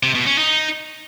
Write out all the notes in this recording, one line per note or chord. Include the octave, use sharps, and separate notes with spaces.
C3
B2
C#4
D#4